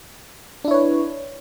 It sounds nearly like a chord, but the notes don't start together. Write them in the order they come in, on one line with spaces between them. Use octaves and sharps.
D4 E4 C#5 B4